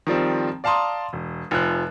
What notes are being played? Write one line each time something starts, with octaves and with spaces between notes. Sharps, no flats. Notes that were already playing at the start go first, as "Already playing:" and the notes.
D#3 F3 G3 C4
D5 F5 A5 A#5 C6 D#6
E1
F1 F3 F#6